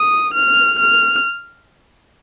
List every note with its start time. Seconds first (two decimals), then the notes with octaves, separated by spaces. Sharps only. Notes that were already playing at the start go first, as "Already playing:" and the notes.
Already playing: D#6
0.33 F6
0.79 F6